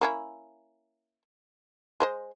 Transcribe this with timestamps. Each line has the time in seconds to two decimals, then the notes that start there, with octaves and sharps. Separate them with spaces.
0.01 A#3 C#4 E4
2.00 G#3 C5 D#5